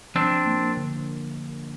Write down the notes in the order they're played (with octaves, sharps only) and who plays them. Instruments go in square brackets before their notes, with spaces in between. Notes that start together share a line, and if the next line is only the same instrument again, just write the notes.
[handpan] F3 [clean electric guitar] C4 D4
[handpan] A#3
D3